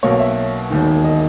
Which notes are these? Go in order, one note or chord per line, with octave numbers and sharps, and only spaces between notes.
B1 B2 A#3 C#5
E5
E1 D#2 D#3
D#5